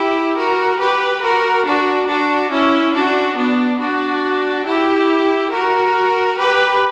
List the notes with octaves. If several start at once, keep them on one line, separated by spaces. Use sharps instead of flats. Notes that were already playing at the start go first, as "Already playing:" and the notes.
Already playing: E4 G4
F#4 A#4
G4 B4
F#4 A#4
D4 F#4
D4 F#4
C#4 E4
D4 F#4
B3 D4
D4 F#4
E4 G4
F#4 A#4
G4 B4